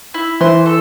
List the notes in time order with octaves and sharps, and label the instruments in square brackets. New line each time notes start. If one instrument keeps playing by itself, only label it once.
[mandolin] E4
[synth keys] E3 [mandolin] C5
[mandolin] A4